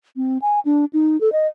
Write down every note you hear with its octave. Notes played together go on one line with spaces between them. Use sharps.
C4
G#5
D4
D#4
A4
D#5